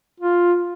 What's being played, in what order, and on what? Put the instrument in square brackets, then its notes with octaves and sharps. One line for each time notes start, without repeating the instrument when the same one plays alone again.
[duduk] F4